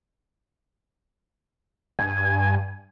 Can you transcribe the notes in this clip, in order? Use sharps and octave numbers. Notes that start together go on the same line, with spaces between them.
G2 G#5